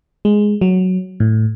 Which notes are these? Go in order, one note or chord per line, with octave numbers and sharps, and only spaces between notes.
G#3
F#3
A2